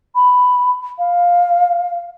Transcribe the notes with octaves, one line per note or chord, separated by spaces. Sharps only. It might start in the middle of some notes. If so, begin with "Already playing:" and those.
B5
F5